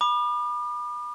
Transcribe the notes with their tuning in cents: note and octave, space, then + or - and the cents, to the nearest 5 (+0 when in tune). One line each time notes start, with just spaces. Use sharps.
B5 -20 D6 +45